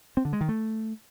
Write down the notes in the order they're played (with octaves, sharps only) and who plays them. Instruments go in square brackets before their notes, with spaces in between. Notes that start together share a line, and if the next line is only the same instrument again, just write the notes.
[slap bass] C4
D3
G#3
D#3
A3